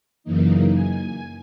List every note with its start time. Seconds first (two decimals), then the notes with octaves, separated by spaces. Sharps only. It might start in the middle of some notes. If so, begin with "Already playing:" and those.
0.24 F#2 C#3 E3 A#3 D#4
0.73 G#5